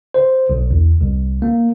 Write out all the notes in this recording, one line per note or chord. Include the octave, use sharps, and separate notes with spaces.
C5
B1
E2
C2
A#3